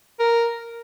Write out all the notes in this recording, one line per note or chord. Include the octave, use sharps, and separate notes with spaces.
A#4